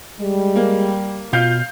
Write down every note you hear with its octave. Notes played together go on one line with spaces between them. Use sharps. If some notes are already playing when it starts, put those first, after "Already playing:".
G3 G#3
A#3
B2 F4 F5 G6